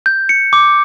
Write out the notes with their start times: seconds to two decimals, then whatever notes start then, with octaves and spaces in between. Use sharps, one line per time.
0.06 G6
0.29 C#7
0.53 D6